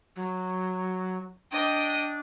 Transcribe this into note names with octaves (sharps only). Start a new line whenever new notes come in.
F#3
D4 D#5 G5